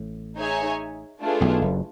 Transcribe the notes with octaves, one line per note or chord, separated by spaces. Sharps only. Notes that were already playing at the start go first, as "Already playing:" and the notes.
Already playing: A1 A2
D#4 G#4 C#5 E5 G#5
A3 D4 F4 G#4 B4
B1 B2
F#1 F#2